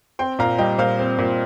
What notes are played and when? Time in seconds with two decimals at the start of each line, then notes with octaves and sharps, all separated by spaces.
0.19 C4 G5 C6
0.39 A#2 F5 A#5
0.58 G3 D#5 G5
0.78 A#2 C5 F5
0.99 C4
1.18 A#2